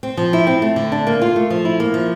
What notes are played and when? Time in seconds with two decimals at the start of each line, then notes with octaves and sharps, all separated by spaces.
0.03 C4
0.17 F3
0.33 E4
0.47 C4
0.62 A3
0.76 D3
0.92 D4
1.07 A#3
1.22 F4
1.36 A3
1.50 F3
1.65 E4
1.80 A#3
1.94 F3